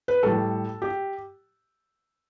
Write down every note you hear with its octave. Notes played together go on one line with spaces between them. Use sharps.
B4
A2 G3 A4
G4